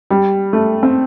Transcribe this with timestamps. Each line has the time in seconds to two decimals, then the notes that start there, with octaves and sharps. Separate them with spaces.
0.11 G3
0.53 A3
0.83 C4